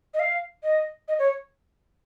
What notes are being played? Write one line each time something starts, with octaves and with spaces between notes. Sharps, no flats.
D#5
F5
D#5
D#5
C#5